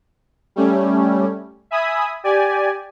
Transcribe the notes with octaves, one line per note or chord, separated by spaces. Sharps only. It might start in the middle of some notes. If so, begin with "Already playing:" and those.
G3 A3 C#4
E5 G#5 B5 D#6
G4 D5 G#5